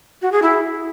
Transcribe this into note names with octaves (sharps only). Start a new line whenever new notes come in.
F#4
G#4
E4